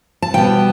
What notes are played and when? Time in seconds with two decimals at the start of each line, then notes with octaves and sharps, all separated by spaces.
0.22 A5
0.34 B2 G3 B3 G5